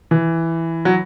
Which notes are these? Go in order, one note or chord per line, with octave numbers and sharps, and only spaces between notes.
E3
F#3